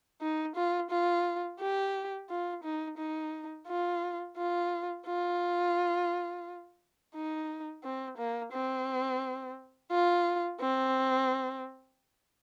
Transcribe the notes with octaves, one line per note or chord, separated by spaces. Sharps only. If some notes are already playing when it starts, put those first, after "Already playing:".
D#4
F4
F4
G4
F4
D#4
D#4
F4
F4
F4
D#4
C4
A#3
C4
F4
C4